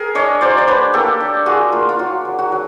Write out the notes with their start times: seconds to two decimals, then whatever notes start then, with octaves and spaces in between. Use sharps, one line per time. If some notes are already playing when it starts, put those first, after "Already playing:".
Already playing: G#4 A#4
0.15 D4 C#5 D#5
0.41 F#3 C5 D5
0.58 D5
0.67 D4 B4 C#5
0.93 A#3 G4 A4
1.20 D4
1.46 F4 F#4 G#4
1.72 A#3 F4
1.89 F4
1.99 F#3 F#4
2.25 F#3
2.39 F#4
2.52 F#3